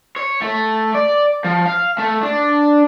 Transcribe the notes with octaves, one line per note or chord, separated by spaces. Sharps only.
C#5
A3
D5
F3
F5
A3
D4